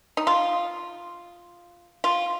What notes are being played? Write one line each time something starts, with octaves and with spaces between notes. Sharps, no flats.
D#4
F4
F4